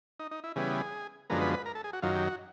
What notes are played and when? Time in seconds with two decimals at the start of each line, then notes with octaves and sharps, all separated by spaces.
0.19 D#4
0.31 D#4
0.44 E4
0.56 C#3 E3 G3 B3 G#4
1.30 F#2 D3 F3 G#3 B3 A#4
1.41 B4
1.54 B4
1.66 A#4
1.75 A4
1.84 G#4
1.93 F#4
2.02 F#2 D#3 F#3 F4
2.15 G4
2.28 F#4